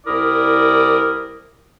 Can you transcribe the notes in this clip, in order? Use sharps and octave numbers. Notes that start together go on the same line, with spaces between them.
C2 E4 A#4 D5 D#6